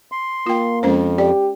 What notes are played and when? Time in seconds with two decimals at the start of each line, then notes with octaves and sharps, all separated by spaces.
0.12 C6
0.46 A#3 F4 G5
0.83 F2 G#3 C#4 C5
1.18 G4 D5